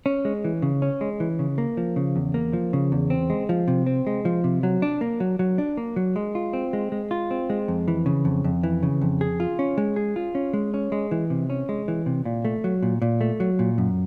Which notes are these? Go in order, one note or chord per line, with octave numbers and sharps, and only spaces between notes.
C#4
G#3
E3
C#3
C#4
G#3
E3
C#3
A#3
F3
C#3
E2
A#3
F3
C#3
E2
C4
G#3
F3
C3
C4
G#3
F3
C3
F#3
D4
A#3
F#3
F#3
D4
A#3
F#3
G#3
F4
C4
G#3
G#3
F4
C4
G#3
F2
E3
C#3
F2
F2
E3
C#3
F2
G#4
F4
C#4
G#3
G#4
F4
C#4
G#3
C#4
G#3
E3
C3
C#4
G#3
E3
C3
A#2
A3
F#3
A#2
A#2
A3
F#3
A#2
F#2